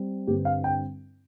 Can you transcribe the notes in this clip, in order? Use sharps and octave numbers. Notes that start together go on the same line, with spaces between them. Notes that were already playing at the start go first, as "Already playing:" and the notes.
Already playing: G3 C4
G2 D3 G3 C4 G4
F5
G5